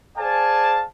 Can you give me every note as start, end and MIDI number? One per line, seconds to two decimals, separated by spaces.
0.18 0.84 68
0.18 0.84 72
0.18 0.84 74
0.18 0.84 77
0.18 0.84 80
0.18 0.84 81